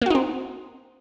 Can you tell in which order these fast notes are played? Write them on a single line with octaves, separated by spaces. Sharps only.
A#3 F#4 D#4 C4